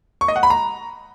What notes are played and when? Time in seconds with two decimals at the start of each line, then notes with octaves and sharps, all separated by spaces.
0.21 C#6
0.28 D#5
0.36 F#5
0.43 B5
0.50 A#5